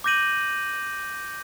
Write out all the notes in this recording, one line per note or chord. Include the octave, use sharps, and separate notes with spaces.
D6 G6 A#6 D#7 F#7